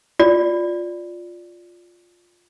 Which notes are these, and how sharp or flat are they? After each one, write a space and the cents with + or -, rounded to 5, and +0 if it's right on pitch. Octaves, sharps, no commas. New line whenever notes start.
F4 +10 D5 +0